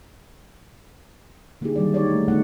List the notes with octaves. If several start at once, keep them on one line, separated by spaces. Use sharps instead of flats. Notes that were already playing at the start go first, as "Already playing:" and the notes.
D3 A#3 D#4 E4 G4 G#4
D#3 F#3 G3 D5
D#4 G4 C#5 D5
A3
D3 A3 B3 D#4 F4 F#5